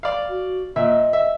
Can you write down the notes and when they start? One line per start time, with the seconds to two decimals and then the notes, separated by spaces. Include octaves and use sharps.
0.03 D5 F5
0.30 F#4
0.76 A#2 D#5 E5
1.13 E5